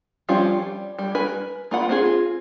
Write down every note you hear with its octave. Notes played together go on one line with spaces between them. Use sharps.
F3 G3 C4 C#4 F4
G3
G3
A#4 B4 G#5
A#3 F4 F#5 B5
C4 F4 G#4